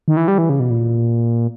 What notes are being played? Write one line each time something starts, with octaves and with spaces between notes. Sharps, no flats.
D#3
E3
G3
E3
C#3
B2
A#2